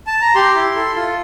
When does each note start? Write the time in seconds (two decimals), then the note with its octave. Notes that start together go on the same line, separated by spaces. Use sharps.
0.07 A5
0.21 A#5
0.35 G4 C6
0.55 E4
0.76 A4
0.95 F4